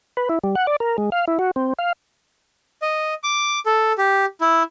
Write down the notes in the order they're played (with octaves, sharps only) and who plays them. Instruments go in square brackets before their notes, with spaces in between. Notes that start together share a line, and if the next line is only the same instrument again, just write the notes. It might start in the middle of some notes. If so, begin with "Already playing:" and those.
[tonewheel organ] B4
E4
G3
F#5
D5
A#4
G#3
F5
E4
F#4
C4
F5
[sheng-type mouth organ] D#5
D6
A4
G4
E4